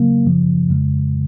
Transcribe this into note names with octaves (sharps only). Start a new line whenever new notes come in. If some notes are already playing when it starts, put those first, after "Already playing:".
Already playing: C#3 F#3 A#3
F#2 C#3 F3
F2 C#3 G#3